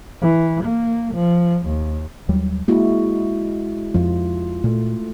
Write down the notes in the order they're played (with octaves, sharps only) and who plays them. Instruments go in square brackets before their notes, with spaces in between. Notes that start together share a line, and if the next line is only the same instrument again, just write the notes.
[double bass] E3
A#3
F3
D#2
[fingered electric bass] D#2 F#3 G3
[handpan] G#3 E4 F#4 [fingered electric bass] A#3
[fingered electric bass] F2 F3 [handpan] F4
[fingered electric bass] A#2 [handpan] A3